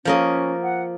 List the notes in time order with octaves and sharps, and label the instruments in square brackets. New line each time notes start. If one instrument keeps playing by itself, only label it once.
[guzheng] F3 A#3 D#5 [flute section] C#4
[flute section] F#5